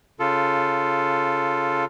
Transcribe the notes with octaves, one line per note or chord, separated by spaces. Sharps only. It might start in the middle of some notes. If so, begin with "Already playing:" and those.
C#3 F4 A4